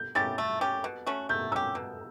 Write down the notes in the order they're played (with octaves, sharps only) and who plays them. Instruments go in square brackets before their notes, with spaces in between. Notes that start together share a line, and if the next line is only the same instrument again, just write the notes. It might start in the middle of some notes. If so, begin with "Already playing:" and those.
Already playing: [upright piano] G6
[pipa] C#4 E4 G4 [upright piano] A6
[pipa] A3
C#4 G4
B2
A3 C#4 F#4
[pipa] A3 [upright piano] G6
[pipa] C#4 G4 [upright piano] E6
[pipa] B2